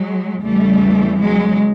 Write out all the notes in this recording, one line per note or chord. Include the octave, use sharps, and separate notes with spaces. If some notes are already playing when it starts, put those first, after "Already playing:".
Already playing: F#3 G#3
E2 C#3 E3 G3 A3
F#3 G#3